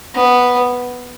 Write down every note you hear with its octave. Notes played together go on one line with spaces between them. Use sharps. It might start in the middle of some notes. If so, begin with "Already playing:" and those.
B3